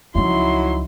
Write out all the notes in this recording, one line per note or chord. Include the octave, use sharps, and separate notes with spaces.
C#2 F3 F#3 D#4 E4 C6